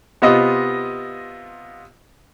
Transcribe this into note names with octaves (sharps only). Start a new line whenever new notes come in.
C3 B3 F4 D#5 D#6